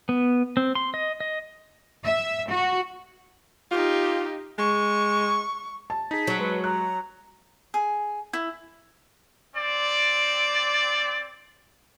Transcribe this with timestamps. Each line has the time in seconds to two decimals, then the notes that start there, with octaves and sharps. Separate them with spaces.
0.09 B3
0.57 C4
0.75 C6
0.94 D#5
1.20 D#5
2.03 E5
2.49 F#4
3.71 D#4 F4 G4
4.59 G#3 C#6
5.90 A5
6.11 D#4 G#4 B6
6.27 F#3
6.39 G#3 B4
6.64 A#5 F#6
7.74 G#4
8.33 E4
9.56 C4 D5